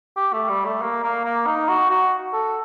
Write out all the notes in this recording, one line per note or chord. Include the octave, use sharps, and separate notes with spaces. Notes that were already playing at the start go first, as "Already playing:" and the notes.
G4
A3
G3
A3
A#3
A#3
A#3
D#4
F#4
F#4
A4